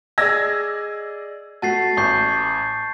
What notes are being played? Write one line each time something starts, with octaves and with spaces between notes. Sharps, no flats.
G#4 D5 D#5 E6 G#6 A#6
A3 F#4 A5 A6 C7
A1 C#6 G6 C7